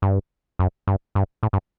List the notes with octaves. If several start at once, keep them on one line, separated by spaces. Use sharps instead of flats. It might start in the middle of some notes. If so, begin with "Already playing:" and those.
G2
F#2
G2
G2
A2
G2